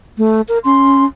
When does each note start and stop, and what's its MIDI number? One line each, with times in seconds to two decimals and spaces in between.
0.18 0.41 57
0.49 0.58 70
0.65 1.05 61
0.65 1.04 84